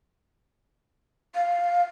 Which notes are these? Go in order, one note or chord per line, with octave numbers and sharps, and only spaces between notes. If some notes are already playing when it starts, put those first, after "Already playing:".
F5